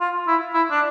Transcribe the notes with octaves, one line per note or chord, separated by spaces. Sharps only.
F4
E4
E4
D4